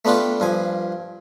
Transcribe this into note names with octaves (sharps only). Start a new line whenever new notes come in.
A3 B3 D4 F4 G4
G2 F3 G#5